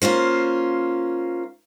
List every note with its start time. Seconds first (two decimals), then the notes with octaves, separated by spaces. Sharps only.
0.02 A#3 C#4 F4 C5